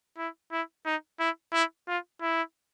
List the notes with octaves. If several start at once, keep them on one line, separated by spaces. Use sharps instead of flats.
E4
E4
D#4
E4
E4
F4
E4